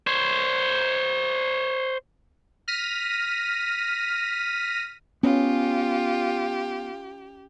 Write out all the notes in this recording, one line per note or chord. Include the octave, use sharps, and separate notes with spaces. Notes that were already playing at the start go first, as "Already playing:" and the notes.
C5 C#5
F6 A#6 B6 D#7
B3 C#4 F4 G4